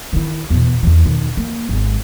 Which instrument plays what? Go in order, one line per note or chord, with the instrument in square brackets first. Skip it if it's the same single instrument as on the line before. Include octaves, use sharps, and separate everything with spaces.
[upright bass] D#3 E4
E2 B2
E2 E3
B2 D#3
A#3
G#1 G#3